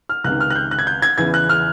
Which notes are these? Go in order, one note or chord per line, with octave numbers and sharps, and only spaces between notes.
F6
C#2 C3 D#3 F#6
F6
F#6
G6
F#6
G#6
G6
G#6
E2 C#3 E3 G#6
F#6
F6